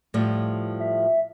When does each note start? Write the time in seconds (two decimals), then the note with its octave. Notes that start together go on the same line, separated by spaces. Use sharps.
0.14 A2 F3 G3
0.80 E5